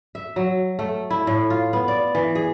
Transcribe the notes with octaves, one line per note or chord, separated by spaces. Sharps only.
E5
F#3
A3
E4
A2
F4
B3
D5
E3
G#4